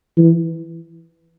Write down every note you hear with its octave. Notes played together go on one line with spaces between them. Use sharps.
E3